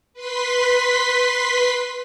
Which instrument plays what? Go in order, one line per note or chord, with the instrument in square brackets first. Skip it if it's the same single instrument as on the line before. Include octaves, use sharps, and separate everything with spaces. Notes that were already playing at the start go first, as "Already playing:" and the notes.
[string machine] B4 C6 B6